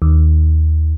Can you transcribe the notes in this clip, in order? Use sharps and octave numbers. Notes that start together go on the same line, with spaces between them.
D#2